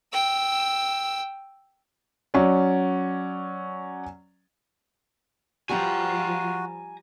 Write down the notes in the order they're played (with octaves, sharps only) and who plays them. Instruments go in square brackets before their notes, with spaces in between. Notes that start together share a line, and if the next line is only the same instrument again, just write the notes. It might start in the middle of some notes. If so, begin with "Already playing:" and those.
[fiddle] G5 E6
[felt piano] F#3 C#4 D5
[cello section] F3 F4 [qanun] G3 B4 G5 [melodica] F#4 [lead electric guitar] G#5 A#5